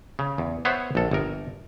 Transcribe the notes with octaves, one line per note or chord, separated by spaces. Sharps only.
C#3
E2
B3 C5 C#5 E5 F#5
A#1 A4
G1 A#4